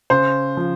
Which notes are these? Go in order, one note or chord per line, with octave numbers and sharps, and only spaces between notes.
C#3 C5
F3